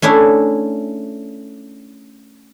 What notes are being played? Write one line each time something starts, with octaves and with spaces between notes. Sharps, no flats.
A3 C#4 D4 E4 G#4